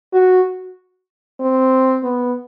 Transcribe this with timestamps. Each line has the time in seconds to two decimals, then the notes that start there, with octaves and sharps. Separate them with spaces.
0.13 F#4
1.40 C4
2.04 B3